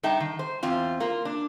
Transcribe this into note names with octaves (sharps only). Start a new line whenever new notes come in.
G2 D#4 E5 G5 A5
D#3
C5
E2 C4 F4
A#3 F4
D4